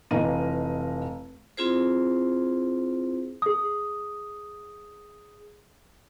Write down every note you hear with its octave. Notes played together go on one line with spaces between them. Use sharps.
F1 E3 D#5 F5 A#5 D#7
C4 E4 F4 G#4 C5
G#4 D#6